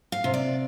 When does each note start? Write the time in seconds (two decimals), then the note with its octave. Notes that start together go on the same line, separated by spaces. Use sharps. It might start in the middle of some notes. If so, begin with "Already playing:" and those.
0.12 F5
0.24 C3
0.34 D5